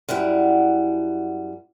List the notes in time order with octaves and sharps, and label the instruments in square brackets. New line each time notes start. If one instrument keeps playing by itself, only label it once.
[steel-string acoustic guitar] F#2 G3 E4 F#5